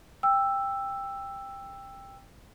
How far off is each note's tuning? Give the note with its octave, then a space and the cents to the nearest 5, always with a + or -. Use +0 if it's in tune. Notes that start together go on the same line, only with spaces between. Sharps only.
G5 +15 E6 +5